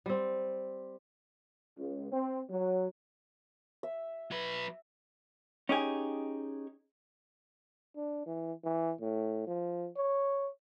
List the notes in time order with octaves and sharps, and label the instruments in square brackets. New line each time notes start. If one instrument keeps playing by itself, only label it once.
[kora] G3 C4
[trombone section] C#2
C4
F#3
[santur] E5
[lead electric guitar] F#3 B4
[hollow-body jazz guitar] C#4 D#4 G4 G#4
[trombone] D4
E3
E3
A2
F3
C#5